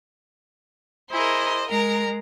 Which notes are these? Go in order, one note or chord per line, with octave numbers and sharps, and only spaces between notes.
E4 G#4 A#4 C5 D#5
G#3 A#4 A#5